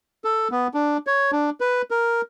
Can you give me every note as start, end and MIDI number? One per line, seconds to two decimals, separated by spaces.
0.25 0.48 69
0.51 0.67 59
0.74 0.97 62
1.07 1.31 73
1.32 1.50 62
1.61 1.82 71
1.91 2.21 70